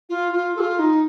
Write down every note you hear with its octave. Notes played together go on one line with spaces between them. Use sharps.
F4
F4
A4
F4
D#4